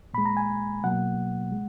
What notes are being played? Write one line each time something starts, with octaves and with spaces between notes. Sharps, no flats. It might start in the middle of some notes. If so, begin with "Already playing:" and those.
A#2 G#3 B5
A#5
G#5
B2 F#3 A#3 F#5
G#3